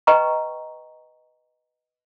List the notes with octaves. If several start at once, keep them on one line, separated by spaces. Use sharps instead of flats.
B4 D#5 F#5 G5 A#5 C#6